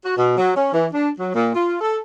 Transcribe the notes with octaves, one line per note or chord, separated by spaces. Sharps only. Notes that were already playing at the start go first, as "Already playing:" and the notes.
F#4
B2
F#3
C#4
E3
D4
F#3
A#2
F4
A4